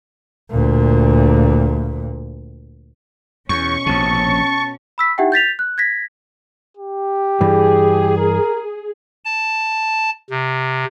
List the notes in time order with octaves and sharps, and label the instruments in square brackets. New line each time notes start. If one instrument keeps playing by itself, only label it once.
[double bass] D2 A#2
[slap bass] E2 [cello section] B2 C#4 [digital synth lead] C#6
[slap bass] A#1 C3 [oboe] A5
[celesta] B5 E6 B6
D#4 E4 G4 E5 F#5 G5
G6 A6 B6 F7
F#6
G#6 A#6 B6
[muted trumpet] G4
[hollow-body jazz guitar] G2 E3 [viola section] G#4
[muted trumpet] A#4
[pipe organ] A5
C3